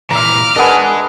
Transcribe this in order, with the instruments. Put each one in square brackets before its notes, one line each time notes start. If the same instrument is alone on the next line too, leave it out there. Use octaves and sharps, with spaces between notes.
[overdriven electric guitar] A#2 E3 [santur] E5 A#5 [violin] D6 F6
[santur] D4 G#4 B4 [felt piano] A#4 F#5 [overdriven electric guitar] D#5 G#5